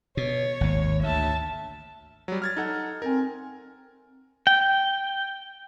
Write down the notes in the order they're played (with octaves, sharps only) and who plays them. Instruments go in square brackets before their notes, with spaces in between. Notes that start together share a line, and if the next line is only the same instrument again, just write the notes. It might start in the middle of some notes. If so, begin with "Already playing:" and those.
[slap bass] B2 [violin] C#5
[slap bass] G#1 D#2
[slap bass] D2 [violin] E5 A5
[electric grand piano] F#3 G3
F6 G#6 A6
D#4 A4 F#5
[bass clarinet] C4 [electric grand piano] A#4 G#5
[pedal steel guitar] G5